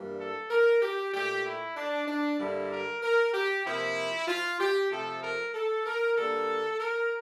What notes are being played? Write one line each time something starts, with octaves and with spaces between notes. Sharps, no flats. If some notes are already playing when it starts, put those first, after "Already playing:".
Already playing: G2 E3 G3 A#3
A4
A#4
G4
A#2 A3 G4
E4
D4
D4
G2 D3 G3 A#3 E4
A#4
A#4
G4
C3 F3 A#3 E4
F4
G4
C3 F3 A3 A4
A#4
A4
A#4
D3 G3 A#3 A4
A#4